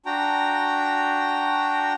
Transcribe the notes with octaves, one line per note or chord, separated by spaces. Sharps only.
D4 F#4 G5 A#5